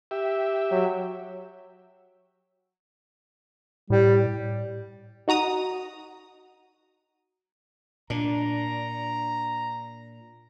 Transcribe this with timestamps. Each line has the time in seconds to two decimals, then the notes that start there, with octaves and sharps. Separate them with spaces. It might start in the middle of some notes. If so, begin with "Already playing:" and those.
0.11 G4 E5
0.71 F#3
3.90 A2 G3
5.28 D#4 F#4 A#5 D#6
8.10 A#2 D4 A#5